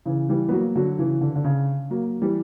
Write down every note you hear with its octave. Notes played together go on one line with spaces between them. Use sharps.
C#3 E3
E3 G3
B3
F#3 A#3
D3 F#3
C#3 E3
D3
D3
C#3
F#3 A#3
E3 G3